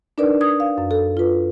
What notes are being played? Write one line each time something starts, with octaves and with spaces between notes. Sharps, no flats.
D4 D#4 A#4 B4 D5
D#6 G#6
F5
F#2
A4
F4 B4